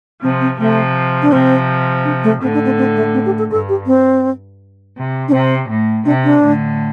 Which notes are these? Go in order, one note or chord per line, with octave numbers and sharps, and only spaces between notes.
C3 F3 C4
C4
C3 F3 A3
D4
C3 F3 C4
D4
A3
A2 D3 C4
D4
C4
C4
A3
C4
G4
A4
G2 A4
G4
C4
C3
D4
C3 C4
A2
C3 D4
D4
A2 D3